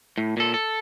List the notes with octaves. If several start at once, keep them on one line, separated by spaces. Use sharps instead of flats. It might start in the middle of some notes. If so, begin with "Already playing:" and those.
A2
A#2 A4
A4